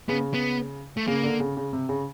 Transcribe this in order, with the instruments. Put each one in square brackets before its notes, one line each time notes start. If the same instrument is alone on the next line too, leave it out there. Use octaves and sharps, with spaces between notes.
[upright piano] C#3 [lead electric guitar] B3
[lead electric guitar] B3
A3
[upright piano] C#3 [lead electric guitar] A#3
[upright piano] D3
C#3
C#3
C3
C#3